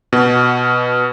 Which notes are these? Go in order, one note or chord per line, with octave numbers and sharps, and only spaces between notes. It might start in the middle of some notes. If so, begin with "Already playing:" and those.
B2